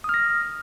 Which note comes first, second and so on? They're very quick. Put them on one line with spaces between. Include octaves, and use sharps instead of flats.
D#6 F6 A#6